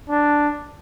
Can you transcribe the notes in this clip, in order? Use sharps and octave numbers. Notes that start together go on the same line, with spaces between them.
D4